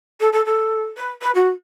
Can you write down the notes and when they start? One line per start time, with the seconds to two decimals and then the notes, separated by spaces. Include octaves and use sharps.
0.20 A4
0.32 A4
0.45 A4
0.97 B4
1.21 B4
1.34 F#4